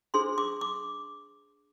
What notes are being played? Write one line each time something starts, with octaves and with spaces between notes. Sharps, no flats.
D4 G#4 C5 C6
D6
D6